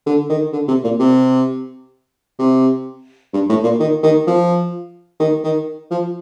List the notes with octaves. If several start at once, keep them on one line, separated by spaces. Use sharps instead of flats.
D3
D#3
D3
C3
A#2
C3
C3
G2
A2
A#2
D#3
D#3
F3
D#3
D#3
F3